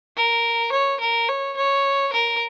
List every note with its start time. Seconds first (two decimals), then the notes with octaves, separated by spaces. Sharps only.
0.17 A#4
0.72 C#5
1.01 A#4
1.29 C#5
1.57 C#5
2.13 A#4